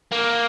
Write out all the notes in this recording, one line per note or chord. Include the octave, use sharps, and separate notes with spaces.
A#3